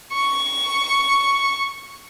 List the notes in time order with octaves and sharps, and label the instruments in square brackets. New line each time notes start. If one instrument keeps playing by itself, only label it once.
[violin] C#6